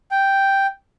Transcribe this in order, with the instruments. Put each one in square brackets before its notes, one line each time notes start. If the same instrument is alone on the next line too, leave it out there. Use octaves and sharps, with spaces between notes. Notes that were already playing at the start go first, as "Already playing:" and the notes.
[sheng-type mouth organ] G5